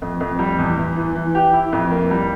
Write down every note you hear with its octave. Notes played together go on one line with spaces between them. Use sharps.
F2
F2
G3
E2
E2
E3
E3
G4
E4
F2
A#3
G3